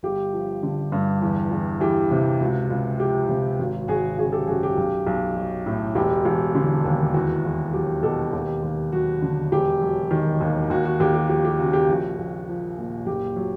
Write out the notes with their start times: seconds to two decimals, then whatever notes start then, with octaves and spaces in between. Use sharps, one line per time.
0.03 G1 G4
0.33 F3
0.63 D3
0.92 G2
1.22 E2
1.51 E2
1.80 E3 G4
2.11 C3
2.40 C#2 F#4
2.70 C#2
3.00 F3 G4
3.29 C3
3.59 G#1 F#4
3.88 G#1 F#4 G#4
4.18 C#3 F#4 G#4
4.32 G4 A4
4.47 F#2 F#4 G#4
4.63 G4
4.77 B1
5.07 B1
5.36 F#3
5.66 A2
5.95 E1 G4
6.25 E1
6.55 D3
6.85 D#2
7.14 E2 F#4
7.45 E2
7.73 F#3 G4
8.03 B2 G4 A4
8.33 D#2 G4
8.63 D#2
8.92 F#3 F#4
9.22 D3
9.52 E1 G4
9.81 F#3
10.11 D#3
10.41 D#2
10.70 D#2 F#4
10.85 F#4
11.00 D#2 G4
11.14 G4
11.29 F3 G4
11.45 G4
11.59 C#3 F#4
11.73 G4
11.89 A#1 F#4
12.19 A#1
12.48 F3
12.78 A#2
13.07 F#1 G4
13.36 F#3